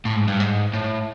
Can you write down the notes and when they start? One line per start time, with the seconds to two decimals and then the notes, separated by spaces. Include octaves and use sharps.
0.05 A2
0.16 G#2
0.28 G2
0.40 G#2
0.73 A2